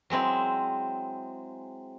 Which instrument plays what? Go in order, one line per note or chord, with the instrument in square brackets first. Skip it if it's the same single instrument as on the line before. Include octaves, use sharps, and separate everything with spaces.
[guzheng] F#3 G#3 C4 E4